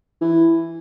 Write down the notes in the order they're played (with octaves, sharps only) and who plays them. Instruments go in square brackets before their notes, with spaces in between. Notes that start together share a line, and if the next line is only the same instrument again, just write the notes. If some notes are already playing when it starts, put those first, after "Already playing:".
[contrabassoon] E3